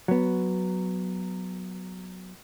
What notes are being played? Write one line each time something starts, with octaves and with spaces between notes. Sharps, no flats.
F#3 B3